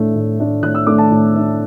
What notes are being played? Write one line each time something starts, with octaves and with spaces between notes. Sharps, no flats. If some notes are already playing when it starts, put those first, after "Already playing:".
Already playing: A2 A3 D4
A2
A3 D4
A2 F#6
E6
A3 D4 D6
A5
A2
A3 D4